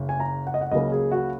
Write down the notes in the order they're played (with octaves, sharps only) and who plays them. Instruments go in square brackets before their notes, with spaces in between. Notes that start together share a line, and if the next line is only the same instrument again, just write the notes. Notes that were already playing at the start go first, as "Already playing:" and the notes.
Already playing: [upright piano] F#1 C#3
G#5
A#5
F#5
D#5
F#5
C#2 C#3 F#3 A#3 D#5
G#4
F#4